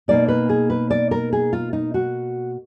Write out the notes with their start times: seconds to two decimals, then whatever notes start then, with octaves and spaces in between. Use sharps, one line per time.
0.08 B2 A#3 D#4 D5
0.28 B4
0.49 G#4
0.70 B4
0.90 D5
1.11 A#4
1.33 G#4
1.53 F4
1.73 D#4
1.94 F#4